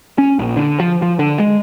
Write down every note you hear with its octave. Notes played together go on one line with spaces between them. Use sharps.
C#4
A#1
D3
F3
F3
D3
G#3